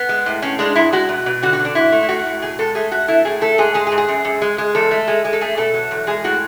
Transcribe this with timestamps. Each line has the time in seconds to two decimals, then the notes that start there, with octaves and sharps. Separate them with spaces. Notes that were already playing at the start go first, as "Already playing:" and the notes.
Already playing: B3
0.09 G#3
0.26 A2
0.42 A2 C#4
0.59 G#3 D4
0.75 G#2 E4
0.93 G#3 F#4
1.09 B2
1.26 B2
1.43 D3 F#4
1.53 F#4
1.59 D3
1.65 D4
1.75 G#2 E4
1.92 A3
2.03 E4
2.09 A2 F#4
2.26 A2
2.42 B2 G#4
2.59 G#3 A4
2.75 A3 G#4
2.91 A3 F#4
3.08 A3 E4
3.25 A2 G#4
3.41 A3 A4
3.58 G#2 G#4
3.74 G#3 G#4
3.87 G#4
3.92 G#2
3.98 G#4
4.08 F#2
4.25 F#2
4.42 G#3
4.58 G#3
4.75 E2 A4
4.91 A3
5.08 G#3
5.25 G#3
5.33 A4
5.41 A3 G#4
5.57 B2 A4
5.74 F#3
5.91 E2
6.07 G#3 G#4
6.24 A2 F#4